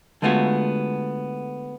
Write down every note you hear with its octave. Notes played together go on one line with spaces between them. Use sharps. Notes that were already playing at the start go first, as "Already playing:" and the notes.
D3 G#3 A3 B3 F4 F#4